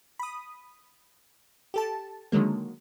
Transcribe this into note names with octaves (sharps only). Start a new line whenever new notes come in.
B5 D#6
G4 A4 A5
D3 D#3 F#3 G#3 A#3